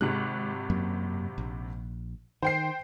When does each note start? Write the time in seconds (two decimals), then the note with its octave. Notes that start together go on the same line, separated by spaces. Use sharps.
0.01 G#1 C3 G#3 F#6
0.70 F#2 F#3 A#3
1.38 A#1
2.43 D#3 C5 G5 C7